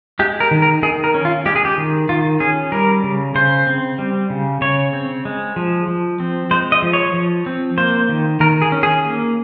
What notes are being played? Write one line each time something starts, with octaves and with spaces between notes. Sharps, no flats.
G#3 G4
A#4
D#3
A#4
D#3 G#4
A#4
C#4
F4
G#3 G4
G#4
G4
D#3
D#3 F4
C#4 G#4
G3 A#4
C#3
C#3 C5
C4
G3
C#3
C#3 C#5
C4
G#3
F3
F3
C4
G#3 C5
D#5
F3
C#5
F3
C4
A#3 C5
D#3
D#3 A#4
G#4
C#4
G#4
A#3